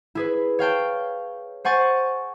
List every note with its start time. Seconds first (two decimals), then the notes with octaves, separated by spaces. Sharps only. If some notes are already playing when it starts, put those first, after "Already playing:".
0.15 E4 G#4 B4
0.59 C#5 F5 G5 A5
1.65 C5 F#5 G#5 C#6 A6